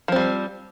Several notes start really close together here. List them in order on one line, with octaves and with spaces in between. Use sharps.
F3 C4 G3